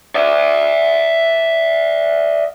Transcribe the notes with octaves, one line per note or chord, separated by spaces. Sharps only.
D5 E5